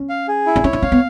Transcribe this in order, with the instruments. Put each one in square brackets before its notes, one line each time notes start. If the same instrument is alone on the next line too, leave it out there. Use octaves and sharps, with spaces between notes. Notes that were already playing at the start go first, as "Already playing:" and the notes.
Already playing: [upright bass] C#4
[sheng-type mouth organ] F5
G#4
E4
[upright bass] D4
[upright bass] C#4 [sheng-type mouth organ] C#5
[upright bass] D4
[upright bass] C#4 [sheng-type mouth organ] F5
[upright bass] B3